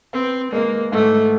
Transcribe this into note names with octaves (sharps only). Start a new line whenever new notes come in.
B3 C4
G#3 A#3
G#2 A3